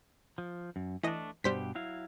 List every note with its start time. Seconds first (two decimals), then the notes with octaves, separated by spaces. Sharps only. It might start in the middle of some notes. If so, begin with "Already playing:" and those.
0.38 F3
0.76 F#2
1.03 E3 A3 D4 D#5
1.44 G2 B2 G3 G4 C5 B6
1.75 F#3 E4 F5